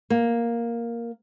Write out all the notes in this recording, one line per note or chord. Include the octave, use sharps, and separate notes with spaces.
A#3